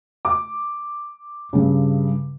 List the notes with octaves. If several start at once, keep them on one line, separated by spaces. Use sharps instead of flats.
D6
G2 C#3